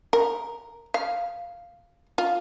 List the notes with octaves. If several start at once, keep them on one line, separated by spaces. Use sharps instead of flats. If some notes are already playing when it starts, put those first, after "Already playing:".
A#4
F5
F4